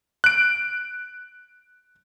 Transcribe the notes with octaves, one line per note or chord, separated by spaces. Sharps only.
F#6 D7